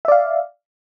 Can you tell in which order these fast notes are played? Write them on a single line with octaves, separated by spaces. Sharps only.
E5 D5 F5